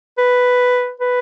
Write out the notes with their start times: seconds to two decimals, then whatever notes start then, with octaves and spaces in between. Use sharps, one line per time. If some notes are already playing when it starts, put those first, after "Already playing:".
0.18 B4
1.00 B4